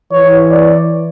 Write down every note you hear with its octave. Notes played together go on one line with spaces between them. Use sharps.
E3 C#5
D5